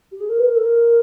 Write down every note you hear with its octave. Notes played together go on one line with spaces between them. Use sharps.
G4
G#4
A#4
B4
A#4
A4
A#4